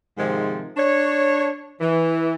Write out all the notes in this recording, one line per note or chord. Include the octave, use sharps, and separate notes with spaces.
G#2 C3 D#3 F3 G#3
D4 C#5
E3